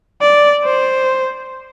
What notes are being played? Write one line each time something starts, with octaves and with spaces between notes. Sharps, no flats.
D5
C5